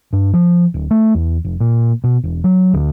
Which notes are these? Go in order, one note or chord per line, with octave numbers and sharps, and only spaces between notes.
G2
F3
D1
A3
E2
F1
A#2
B2
E1
F#3
D2